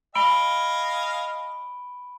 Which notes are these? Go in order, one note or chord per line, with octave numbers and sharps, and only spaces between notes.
D#5 F5 G#5 B5 D7 G7